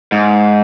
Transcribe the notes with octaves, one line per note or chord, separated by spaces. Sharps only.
G#2